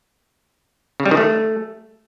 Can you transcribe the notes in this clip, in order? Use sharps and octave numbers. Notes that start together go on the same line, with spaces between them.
C#3
G3
D#3
A3